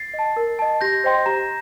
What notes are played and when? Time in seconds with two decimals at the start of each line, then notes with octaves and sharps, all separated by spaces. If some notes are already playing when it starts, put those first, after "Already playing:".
Already playing: A6 C7
0.14 D#5
0.19 A5
0.36 A#4
0.59 D#5 A5
0.81 G4 G6 A#6
1.04 C5 D#5 G5 C6
1.26 G4 A#5